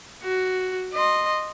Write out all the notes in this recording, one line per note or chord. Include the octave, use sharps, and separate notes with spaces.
F#4
D#5 C6